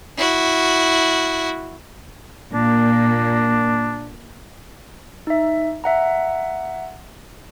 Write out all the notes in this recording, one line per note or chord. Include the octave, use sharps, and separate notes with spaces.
E4 F#4
A#2 A#3 D4
D#4 E5
E5 F#5 A#5